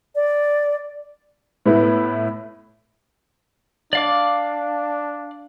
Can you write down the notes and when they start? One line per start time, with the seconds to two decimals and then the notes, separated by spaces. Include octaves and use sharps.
0.15 D5
1.66 A2 B3 E4
3.93 D4 D5 F5 D6